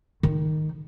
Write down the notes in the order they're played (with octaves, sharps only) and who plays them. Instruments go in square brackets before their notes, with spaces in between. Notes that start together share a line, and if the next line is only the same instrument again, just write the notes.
[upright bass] D#3 D#4